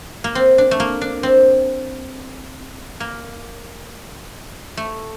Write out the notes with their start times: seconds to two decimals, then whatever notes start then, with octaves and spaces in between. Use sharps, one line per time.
0.24 A#3
0.35 C4
0.58 D4
0.71 A3
0.80 A#3
1.01 D4
1.23 C4
3.00 A#3
4.77 A3